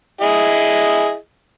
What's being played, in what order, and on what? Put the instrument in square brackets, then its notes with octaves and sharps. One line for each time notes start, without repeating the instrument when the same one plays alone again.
[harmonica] E4 G#4 D#5